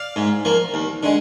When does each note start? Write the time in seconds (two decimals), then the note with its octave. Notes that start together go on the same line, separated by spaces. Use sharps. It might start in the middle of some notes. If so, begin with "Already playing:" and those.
Already playing: D5 F5
0.16 G#2
0.45 F3 A#3
0.74 D#2
1.03 D3 G#3